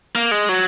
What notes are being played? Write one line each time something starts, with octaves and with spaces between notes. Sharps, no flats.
A#3
G#3
F#3